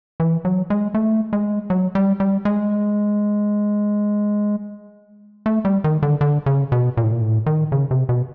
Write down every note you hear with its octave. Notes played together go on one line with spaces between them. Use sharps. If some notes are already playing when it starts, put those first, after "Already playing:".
E3
F#3
G#3
A3
G#3
F#3
G3
G3
G#3
A3
G3
D#3
D3
D3
C#3
B2
A#2
A2
A#2
A2
D#3
C#3
C3
B2